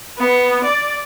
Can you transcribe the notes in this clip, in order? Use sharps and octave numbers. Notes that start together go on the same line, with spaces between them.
B3
D5